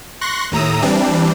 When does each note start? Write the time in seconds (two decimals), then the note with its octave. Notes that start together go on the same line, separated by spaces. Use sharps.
0.21 C6 C#6 F#6 A#6
0.52 D#2 A2 A#5 D#6 E6
0.82 E3 G3 C4 D4